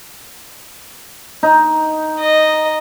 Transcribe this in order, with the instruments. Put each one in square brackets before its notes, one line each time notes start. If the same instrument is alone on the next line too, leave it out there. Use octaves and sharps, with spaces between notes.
[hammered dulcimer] D#4
[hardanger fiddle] D#5